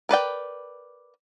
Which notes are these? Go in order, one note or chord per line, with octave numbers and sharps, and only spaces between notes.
A#4 B4 D5 G5